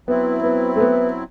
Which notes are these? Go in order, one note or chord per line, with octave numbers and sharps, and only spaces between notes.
F#3 B3 C4 E4
B3
A3
B3